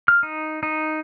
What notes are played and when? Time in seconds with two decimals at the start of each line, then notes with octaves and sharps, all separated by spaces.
0.08 F6
0.23 D#4
0.63 D#4